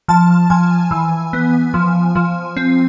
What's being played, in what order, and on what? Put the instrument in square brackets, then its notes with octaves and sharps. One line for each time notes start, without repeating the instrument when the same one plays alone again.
[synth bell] F3 A5
F3 G#5
E3
B3
F3
F3
C4